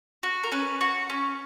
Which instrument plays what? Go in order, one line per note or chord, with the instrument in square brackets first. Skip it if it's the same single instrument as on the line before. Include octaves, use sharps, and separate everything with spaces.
[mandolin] F#4
A#4
C#4 B4
F#4
C#4